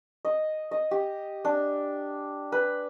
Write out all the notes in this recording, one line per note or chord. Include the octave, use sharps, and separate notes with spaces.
D#5
D#5
G4
D4
B4